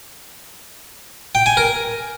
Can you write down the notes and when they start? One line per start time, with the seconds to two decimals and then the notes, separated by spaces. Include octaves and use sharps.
1.35 G5
1.46 G#5
1.57 A#4